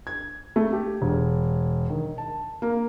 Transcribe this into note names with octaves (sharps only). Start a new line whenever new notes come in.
G#6
A3
G4
E1
D#3
A5
A#3